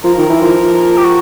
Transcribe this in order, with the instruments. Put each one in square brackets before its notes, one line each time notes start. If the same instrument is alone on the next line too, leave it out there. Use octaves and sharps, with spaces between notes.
[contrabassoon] F3 [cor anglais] A#4
[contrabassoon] D#3
E3
F3
[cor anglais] G4
F#4